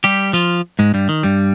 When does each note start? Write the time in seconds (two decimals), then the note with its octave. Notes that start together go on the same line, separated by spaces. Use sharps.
0.04 G3 G4
0.33 F3 F4
0.79 G#2 G#3
0.94 G2 G3
1.09 D#3
1.23 G2 G3